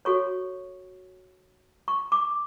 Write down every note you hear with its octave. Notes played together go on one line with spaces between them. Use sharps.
F#4 A4 C#5 C#6
C#6
D6